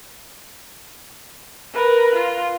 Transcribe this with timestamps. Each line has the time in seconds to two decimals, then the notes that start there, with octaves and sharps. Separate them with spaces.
1.74 A#4 B4
2.15 F4